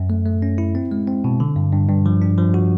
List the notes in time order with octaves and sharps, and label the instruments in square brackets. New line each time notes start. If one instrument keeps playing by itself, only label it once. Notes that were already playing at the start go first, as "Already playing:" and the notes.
Already playing: [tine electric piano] F#2
A3
A3
C#4
E4
C4
G#3
C4
B2
D3
G2
G2
G2
F3
D4
F3
F#4